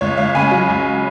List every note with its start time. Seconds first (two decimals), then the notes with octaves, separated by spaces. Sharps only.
0.01 C#2 C#5
0.17 C#2 C#5 F5
0.35 C#3 G#5 B5
0.51 F#3
0.69 C#2